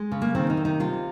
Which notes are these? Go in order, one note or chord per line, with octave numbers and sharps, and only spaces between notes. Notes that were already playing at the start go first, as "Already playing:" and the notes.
Already playing: G#3
C#3
A#3
D#3 C4
D#4
C3
D#4
C3 F4